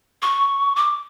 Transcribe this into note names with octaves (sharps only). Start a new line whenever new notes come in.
C#6
D6